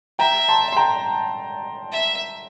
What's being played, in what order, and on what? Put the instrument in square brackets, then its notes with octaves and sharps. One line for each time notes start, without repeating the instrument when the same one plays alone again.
[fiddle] E5 [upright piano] G5 A#5
[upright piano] A5 C6
C6
G5 A#5
[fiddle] E5